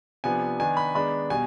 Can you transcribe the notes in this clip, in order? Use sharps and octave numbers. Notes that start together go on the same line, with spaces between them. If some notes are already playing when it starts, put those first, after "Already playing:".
C3 F3 B3 D4 G#5
D#3 B3 D4 G#5
B5
D#3 G#3 B3 D4 B5
B2 G3 G#5